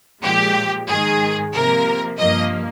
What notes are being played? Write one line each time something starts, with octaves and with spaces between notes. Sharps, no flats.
A#2 F3 G#3 G4
G#2 D#3 G#3 G#4
C3 F3 A#3 A#4
G2 F3 A#3 D#5